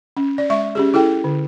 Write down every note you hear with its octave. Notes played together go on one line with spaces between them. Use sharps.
C#4
D5
G#3 E5 C#6
C#4 G4 G#4
E4 G#4 A4 G5
D3